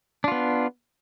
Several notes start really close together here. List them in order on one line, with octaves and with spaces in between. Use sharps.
D4 F4 B3